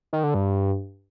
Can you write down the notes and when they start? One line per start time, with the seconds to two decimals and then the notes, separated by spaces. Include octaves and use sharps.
0.13 D#3
0.24 D3
0.34 G2